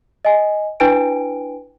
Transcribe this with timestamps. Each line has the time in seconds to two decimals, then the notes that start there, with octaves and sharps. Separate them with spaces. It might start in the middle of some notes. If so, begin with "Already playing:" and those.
0.25 D#5 G#5
0.80 D4 E4 B4 G5 G#5 D7